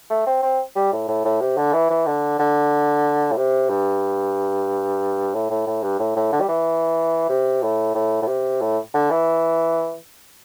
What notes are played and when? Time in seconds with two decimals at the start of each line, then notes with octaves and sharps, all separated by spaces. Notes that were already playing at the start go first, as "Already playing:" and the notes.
0.10 A3
0.27 C4
0.43 C4
0.76 G3
0.92 A2
1.08 A2
1.25 A2
1.41 C3
1.57 D3
1.73 E3
1.90 E3
2.06 D3
2.39 D3
3.32 A2
3.37 C3
3.70 G2
5.34 A2
5.50 A2
5.67 A2
5.83 G2
5.99 A2
6.16 A2
6.32 D3
6.41 G3
6.48 E3
7.29 C3
7.62 A2
7.95 A2
8.22 A2
8.27 C3
8.61 A2
8.94 D3
9.10 E3